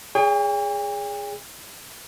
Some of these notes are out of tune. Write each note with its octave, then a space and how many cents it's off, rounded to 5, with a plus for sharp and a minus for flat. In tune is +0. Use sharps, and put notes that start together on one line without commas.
G#4 -5 C#5 +40 G5 +45